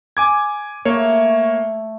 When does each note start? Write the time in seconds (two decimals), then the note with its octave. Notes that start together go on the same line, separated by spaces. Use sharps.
0.17 G#5 D6 G#6
0.85 A3 A#3 C#5